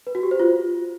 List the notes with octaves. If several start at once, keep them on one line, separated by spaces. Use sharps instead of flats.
B4
F#4
G4
C5
F4